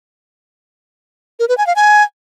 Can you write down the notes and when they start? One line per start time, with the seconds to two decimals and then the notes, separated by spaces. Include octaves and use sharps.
1.40 A#4
1.49 B4
1.58 G#5
1.67 F5
1.76 G#5